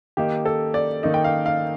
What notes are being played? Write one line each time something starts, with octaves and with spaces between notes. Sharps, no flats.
D#3 A#3 D#4 G4
A4
D5
D#3 A#3 D#4
G5
F5
F5